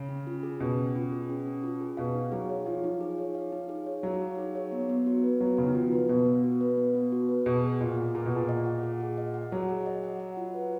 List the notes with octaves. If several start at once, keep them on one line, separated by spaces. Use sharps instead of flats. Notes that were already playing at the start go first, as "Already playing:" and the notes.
Already playing: C#3
C#4
F4
G#4
B2 C#4
C#4
F4
G#4
C#4
C#4
F4
G#4
B2 F5
D#4
F#3 G#4
C#5
F3 F5
D#4
G#4
C#5
F5
D#4
G#4
C#5
F#3 F5
D#4
G#4
C#5
B3
B3
F#4
B4
F#3 B3
C#3 B3
D#3
F3 F#4
B4
B2 B3
B3
F#4
B4
B3
B3
F#4
B4
B2 G#4
G#4
A#2 D#5
F#5
A#2 G#4
B2
A#2 G#4
D#5
F#5
G#4
G#4
D#5
F#5
F#3 G#4
G#4
D#5
F#5
F#5
F4
B4